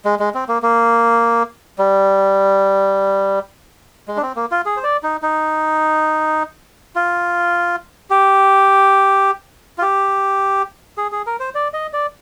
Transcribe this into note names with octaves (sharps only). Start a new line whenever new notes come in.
G#3
G#3
C4
A#3
A#3
G3
G#3
D4
C4
A#3
F4
G#4
C5
D5
D#4
D#4
F4
G4
F4
G4
G#4
G#4
A#4
C5
D5
D#5
D5